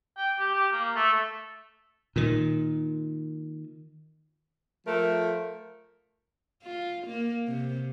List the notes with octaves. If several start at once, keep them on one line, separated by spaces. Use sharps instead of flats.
G5
G4
G4
A#3
A3
A#2 D#3
F3 A3 A4 A#4
F4
A#3
C3